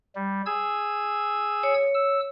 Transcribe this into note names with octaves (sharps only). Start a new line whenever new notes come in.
G3
G#4 E6 G#6
C#5
E6